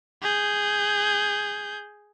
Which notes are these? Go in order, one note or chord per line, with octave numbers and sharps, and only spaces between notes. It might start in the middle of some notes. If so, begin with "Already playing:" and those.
G#4 G6